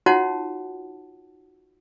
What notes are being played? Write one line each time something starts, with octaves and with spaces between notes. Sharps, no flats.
D#4 F4 F#4 C#5 F#5 A5